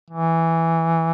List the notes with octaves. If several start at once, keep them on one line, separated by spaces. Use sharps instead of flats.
E3